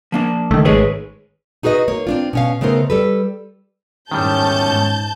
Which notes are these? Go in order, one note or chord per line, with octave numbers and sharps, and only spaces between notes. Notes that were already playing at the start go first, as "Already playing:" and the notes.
F3 A#3 D4
C#2 D#3 A3
G#1 G#2 G#3 G#4 B4 C#5
D#4 F#4 G#4 B4 D#5
A#3 C#5
C4 D4 F4
B2 C#4 F5
C#3 A3 B3 D#4 A#4 C5
G3 A4 B4
E2 G#2 D#3 G3 C#4 A5 G6
G#2